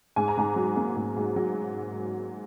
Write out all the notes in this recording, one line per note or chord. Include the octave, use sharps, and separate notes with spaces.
G#2 G#5
A#5
G#2 G#5
F#3
A#3
G#2
G#2
F#3